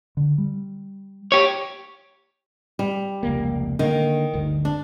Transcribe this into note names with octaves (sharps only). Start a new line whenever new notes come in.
D3
G3
G4 C#5
G3
F1 C#2 A#3
D3 D#3 A#3
G1 D2
D4